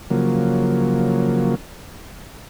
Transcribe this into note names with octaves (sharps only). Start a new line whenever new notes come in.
C#3 F3 F#3 A#3